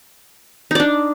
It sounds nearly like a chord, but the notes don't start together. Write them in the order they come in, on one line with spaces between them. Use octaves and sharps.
D#4 D5 D4